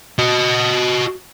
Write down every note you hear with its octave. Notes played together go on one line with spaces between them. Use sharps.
F#4 D#5